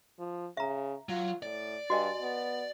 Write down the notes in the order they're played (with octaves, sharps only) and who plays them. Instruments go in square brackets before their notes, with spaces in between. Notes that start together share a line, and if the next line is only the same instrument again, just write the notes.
[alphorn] F3
[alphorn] C#3 [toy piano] E5 A#5
[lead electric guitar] F#3 [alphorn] F4
[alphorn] A2 [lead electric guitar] D5
[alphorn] G2 [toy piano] F#4 D#5 G#5
[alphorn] B3